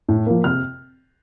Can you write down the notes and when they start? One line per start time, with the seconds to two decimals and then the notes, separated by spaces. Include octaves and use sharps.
0.09 A2
0.26 F3 A#3
0.44 C3 F6